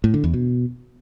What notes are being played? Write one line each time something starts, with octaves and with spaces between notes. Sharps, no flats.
A2
D3
E2
B2